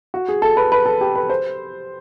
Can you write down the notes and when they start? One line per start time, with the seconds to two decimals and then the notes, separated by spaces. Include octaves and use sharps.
0.14 F#4
0.29 G#4
0.42 A4
0.57 B4
0.72 B4
0.86 A4
1.01 G4
1.15 B4
1.30 C5